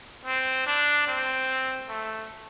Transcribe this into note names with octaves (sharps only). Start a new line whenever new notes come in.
C4
D4
C4
A3